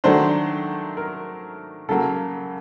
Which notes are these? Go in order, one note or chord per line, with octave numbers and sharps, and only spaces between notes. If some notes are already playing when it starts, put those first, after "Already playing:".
D#3 F#3 A3 D4 C5
A#4
C#3 F#3 A#3 A4